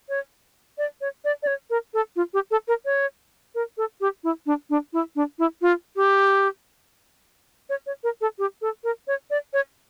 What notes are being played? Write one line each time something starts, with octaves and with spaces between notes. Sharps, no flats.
C#5
D5
C#5
D5
D5
C#5
A#4
A4
F4
G4
A4
A#4
C#5
A#4
A4
G4
E4
D4
D4
E4
D4
E4
F4
G4
C#5
C#5
A#4
A4
G4
A4
A#4
C#5
D5
C#5